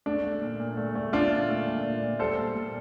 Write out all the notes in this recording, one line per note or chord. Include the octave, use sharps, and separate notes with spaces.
A3 D4
A3
A#2
A#2
A3
A3
A3 D4 F4
A#2
A3
A#2
A#2
A#2
G3 A4 C5
A#2
A#2